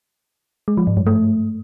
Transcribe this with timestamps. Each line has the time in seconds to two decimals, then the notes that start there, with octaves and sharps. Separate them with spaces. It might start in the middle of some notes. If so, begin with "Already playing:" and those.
0.68 G#3
0.77 F3
0.87 G#2
0.97 G2
1.07 A3